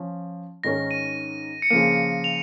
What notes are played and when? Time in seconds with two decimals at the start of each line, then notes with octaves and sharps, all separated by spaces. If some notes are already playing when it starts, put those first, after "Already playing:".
Already playing: F3 C#4
0.64 G#2 D#3 C#4 A#4 A#6
0.91 D#7
1.62 C#7
1.70 C#3 F3 A#3 D#7
2.24 F7